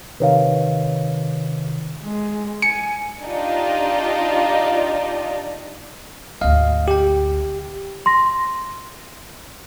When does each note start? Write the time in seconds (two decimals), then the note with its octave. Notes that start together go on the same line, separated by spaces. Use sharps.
0.20 C3 D#3 B4 C#5 F5
2.03 G#3
2.62 G#5 C#7
3.24 D4 D#4 F4 G4 D5 D#5
6.41 G#1 D2 D#5 F5
6.88 G4 G5
8.06 C6 A#6